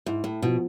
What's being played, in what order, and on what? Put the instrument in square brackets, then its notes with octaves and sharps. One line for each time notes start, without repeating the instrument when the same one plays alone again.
[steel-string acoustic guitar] G#2 [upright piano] E4
[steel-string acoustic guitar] A2
[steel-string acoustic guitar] B2 [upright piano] F3